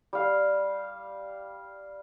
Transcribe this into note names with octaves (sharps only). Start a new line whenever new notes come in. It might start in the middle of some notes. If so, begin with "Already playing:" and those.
G3 F5